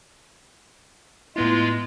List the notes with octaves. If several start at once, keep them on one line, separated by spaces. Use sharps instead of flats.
A2 G#3 B3 E4 F4